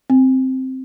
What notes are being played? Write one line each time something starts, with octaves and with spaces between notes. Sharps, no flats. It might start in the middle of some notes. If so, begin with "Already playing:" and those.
C4